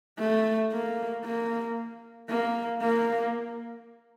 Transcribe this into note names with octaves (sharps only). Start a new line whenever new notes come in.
A3
A#3
A#3
A#3
A#3